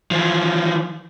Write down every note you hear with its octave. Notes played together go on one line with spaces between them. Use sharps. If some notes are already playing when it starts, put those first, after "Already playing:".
E3 F3